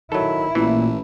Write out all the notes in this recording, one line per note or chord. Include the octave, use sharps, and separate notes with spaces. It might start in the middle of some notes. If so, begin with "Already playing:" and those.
D#3 F#3 E4 A4
A1 A#2 E3